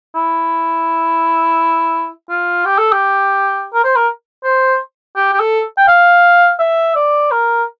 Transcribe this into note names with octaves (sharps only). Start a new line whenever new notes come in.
E4
F4
G4
A4
G4
A#4
C5
A#4
C5
G4
G4
A4
G5
F5
E5
D5
A#4